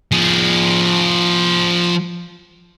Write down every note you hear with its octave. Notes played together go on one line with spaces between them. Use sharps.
F3 G#4